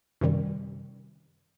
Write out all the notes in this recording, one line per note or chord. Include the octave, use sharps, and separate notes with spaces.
F#2 C3 D#3 G3